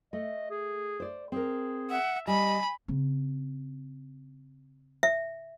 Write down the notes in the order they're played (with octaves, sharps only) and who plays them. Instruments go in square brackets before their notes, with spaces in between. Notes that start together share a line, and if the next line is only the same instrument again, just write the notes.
[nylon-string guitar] A3 [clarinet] D#5
[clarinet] G#4
[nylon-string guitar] C5 D5
[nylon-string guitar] C4 A#4 [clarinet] G#4
[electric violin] E5 [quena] F#5
[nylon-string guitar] G3 [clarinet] D#5 [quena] G#5 [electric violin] B5
[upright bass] C#3 C4
[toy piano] E5